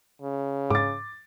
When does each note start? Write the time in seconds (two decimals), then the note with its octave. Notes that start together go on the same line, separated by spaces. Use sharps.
0.22 C#3
0.70 G#2 D6 A6